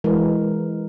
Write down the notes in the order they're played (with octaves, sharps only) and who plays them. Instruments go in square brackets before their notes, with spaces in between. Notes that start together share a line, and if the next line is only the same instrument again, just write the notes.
[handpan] E3 G#3 A#4